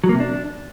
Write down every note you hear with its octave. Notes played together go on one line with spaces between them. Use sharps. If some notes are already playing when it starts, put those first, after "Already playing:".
F#3
A#3
C3
D4